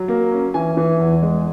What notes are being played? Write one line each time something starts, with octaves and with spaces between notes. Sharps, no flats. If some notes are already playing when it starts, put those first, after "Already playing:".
Already playing: F#3
A#3
C#4
E3 G#5
E3
E2
G#3